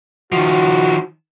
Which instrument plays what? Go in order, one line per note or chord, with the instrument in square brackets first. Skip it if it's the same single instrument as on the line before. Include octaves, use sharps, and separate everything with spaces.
[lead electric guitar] D#3 F3 [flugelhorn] F#4